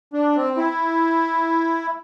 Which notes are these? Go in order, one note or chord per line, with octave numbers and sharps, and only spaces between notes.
D4
C4
E4